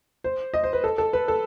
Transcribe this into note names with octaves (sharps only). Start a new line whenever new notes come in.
C5
D#5
C5
B4
A4
A4
B4
A4